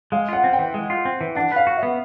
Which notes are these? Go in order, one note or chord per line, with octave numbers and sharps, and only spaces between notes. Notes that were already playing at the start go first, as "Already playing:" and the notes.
G#3 F5
F4 F#5
C4
G5
E3
G#3
F4
C4
E3
D4 F#5
B4 F5
F#4
E5
B3